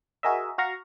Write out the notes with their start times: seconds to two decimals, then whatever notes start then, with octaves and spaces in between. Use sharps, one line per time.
0.23 F#4 G#4 A#4 D#5 E5
0.58 F#4 F5 A#5 C#6